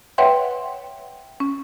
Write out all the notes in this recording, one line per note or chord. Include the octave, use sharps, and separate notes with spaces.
B4 C#5 E5 F#5 G5 C6
C#4